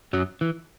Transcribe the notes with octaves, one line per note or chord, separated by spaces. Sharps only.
F#2 F#3
E3